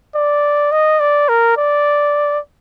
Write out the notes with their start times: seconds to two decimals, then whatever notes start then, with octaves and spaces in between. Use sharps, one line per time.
0.15 D5
0.72 D#5
1.00 D5
1.29 A#4
1.57 D5